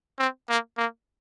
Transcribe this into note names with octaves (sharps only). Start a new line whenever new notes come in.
C4
A#3
A#3